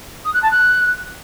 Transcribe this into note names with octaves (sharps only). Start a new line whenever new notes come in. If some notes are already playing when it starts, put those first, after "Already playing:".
D#6
F#6
A5
F#6